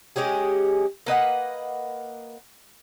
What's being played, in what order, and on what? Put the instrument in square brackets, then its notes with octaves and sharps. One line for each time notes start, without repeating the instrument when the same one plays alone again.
[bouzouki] G#3 C#4 G4 G#4
A#3 B4 D#5 F#5